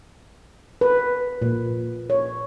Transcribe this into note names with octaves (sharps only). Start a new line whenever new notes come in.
B4
A#2
C#5